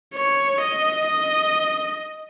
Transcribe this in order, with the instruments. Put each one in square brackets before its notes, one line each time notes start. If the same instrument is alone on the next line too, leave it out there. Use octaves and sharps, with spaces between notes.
[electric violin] C#5
D#5
D#5